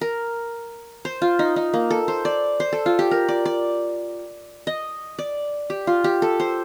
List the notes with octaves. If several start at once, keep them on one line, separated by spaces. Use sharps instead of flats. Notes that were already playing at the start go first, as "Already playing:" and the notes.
A#4
C5
F4
D#4
D#4
A#3
A4
C5
D5
C5
A4
F4
G4
A#4
D5
D5
D#5
D5
G4
F4
G4
A4
C5